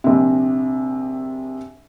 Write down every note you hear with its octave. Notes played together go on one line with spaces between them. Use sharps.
A#1 C3